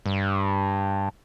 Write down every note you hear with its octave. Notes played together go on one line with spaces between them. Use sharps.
G2